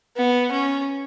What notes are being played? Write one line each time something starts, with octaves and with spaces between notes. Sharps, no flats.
B3
C#4